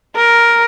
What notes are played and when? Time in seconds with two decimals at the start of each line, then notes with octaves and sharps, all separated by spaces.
0.16 A#4